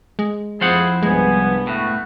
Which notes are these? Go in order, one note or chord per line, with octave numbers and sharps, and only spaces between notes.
G#3
F2 F3 C4 E4 G#4 C5 F#5
C2 G2 G#3 B3 G#5
A2 A3 F#4